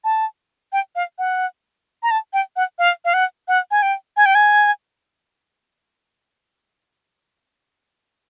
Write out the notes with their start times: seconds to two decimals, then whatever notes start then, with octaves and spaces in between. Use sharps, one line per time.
0.04 A5
0.72 G5
0.95 F5
1.18 F#5
2.03 A#5
2.11 A5
2.33 G5
2.56 F#5
2.79 F5
3.05 F5
3.14 F#5
3.48 F#5
3.71 G#5
3.82 G5
4.17 G#5
4.25 G5
4.35 G#5